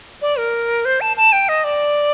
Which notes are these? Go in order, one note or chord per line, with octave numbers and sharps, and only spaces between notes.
D5
A#4
C5
A5
A5
G5
D#5
D5